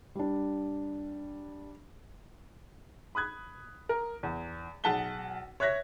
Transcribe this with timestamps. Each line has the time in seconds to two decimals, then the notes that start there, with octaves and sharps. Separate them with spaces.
0.15 G3 D4
3.15 B5 D#6 F#6 G#6
3.89 A#4
4.23 E2
4.84 B1 G#4 F#5 A5 B6 G7
5.60 C#5 E5 F#6 G#6 A#6 B6